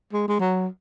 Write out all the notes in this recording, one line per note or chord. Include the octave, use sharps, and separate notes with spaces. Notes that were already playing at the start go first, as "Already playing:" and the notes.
G#3
G#3
F#3